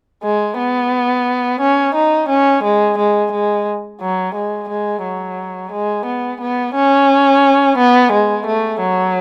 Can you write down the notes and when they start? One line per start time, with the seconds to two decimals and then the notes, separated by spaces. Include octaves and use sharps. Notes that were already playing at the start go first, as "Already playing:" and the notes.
0.24 G#3
0.59 B3
1.61 C#4
1.95 D#4
2.29 C#4
2.63 G#3
2.98 G#3
3.32 G#3
4.01 F#3
4.35 G#3
4.70 G#3
5.03 F#3
5.72 G#3
6.06 B3
6.41 B3
6.75 C#4
7.78 B3
8.12 G#3
8.46 A3
8.80 F#3